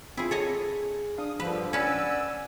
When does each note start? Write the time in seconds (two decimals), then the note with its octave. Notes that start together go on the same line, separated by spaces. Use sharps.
0.17 C4 E4 F4 G#4
0.31 G#4 A4 C#5 D#5
1.18 D4 F5 D#6
1.40 G2 D3 F3 B4
1.73 C#4 B4 D5 F#5 G#5 E6